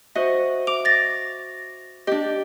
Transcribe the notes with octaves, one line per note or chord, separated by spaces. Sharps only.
F#4 C5 D#5 E5
D6 F7
A6 A#6
D4 G4 D#5